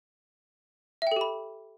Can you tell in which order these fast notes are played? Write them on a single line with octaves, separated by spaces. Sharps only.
E5 G5 A4 G4 B5